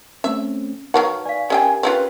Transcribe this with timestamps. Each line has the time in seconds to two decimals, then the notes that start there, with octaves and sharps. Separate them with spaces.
0.24 A3 C4 C#4 E5
0.94 F#3 D#4 A#4 B4 F5 F#5 C#6
1.26 D5 F5 G#5
1.50 C#4 G4 A#4 D#5 G5 G#5
1.83 C4 C#4 F4 B4